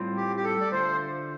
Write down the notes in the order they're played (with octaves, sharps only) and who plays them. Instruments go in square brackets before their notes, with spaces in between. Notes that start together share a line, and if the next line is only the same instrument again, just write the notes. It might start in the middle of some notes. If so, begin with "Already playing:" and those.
Already playing: [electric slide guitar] A2 G3 C4 F4
[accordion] G4
G4
A4
D5
[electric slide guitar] D3 A3 F4 [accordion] C5